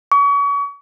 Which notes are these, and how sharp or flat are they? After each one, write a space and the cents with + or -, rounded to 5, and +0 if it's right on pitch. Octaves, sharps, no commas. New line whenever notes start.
C#6 +35